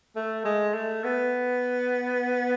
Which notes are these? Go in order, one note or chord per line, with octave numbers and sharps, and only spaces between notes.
A3
G#3
A3
B3